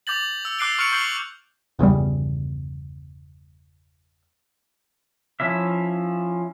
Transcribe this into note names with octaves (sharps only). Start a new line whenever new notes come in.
D6 G6 A6 F#7
E6
D6 F#6 C7 D7 G7
C#6 F6 F#6 C#7 D7 F7
C#6 G6 C7 F#7
G1 E2 C#3 G3
F3 C#4 E4 E5